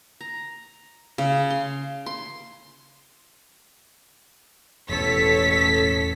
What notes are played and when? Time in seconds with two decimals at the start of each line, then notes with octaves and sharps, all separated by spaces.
0.21 A#5
1.18 C#3
1.50 C6
2.06 C6
4.89 E1 A1 A4 C#5 B6